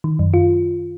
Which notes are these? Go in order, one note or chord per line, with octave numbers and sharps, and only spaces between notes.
D#3
F#2
F4